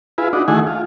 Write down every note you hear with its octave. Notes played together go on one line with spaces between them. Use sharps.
E4 F4 G#4 B4
D4 D#4 F#4
D#3 A3 E4 G#4 F#5 G#5
F4